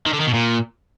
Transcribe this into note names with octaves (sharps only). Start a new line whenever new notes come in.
D#3
D3
D#3
B2
A#2